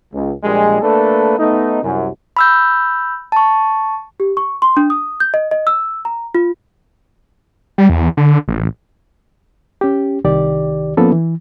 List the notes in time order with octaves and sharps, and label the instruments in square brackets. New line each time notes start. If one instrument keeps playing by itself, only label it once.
[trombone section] C#2
A#1 A#2 G3 G#3
A3 A#3 D4 A4 B4
A3 B3 D#4
C2 F#2
[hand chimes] B5 E6 G6
A5 C#6
[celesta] G4
C#6
C6
D4
D#6
G6
D#5
D#5
E6
A#5
F4
[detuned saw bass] G3
E2
D3
A1
[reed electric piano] C#4 G4
C2 D#3 G4 D5
F3 A#3 B3 C#4 A4 B4
E3